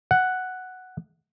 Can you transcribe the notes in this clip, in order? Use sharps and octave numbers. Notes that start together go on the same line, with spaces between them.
F#5